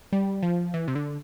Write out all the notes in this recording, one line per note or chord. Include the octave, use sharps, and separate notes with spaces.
G3
F3
E3
C3
D3